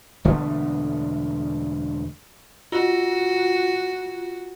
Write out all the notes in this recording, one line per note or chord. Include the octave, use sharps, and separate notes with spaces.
E1 D3 A3 B3
F4 F#4